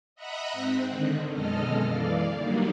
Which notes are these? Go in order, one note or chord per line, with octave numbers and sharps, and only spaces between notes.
D#5 E5 F#5 A#5 B5 F#6
G#2 C4
D3 D#3
F#2 B2 G#3 A4 D#5 F6
E3 D5 F5
D3 D#3 F#3 G3 A#3 D#4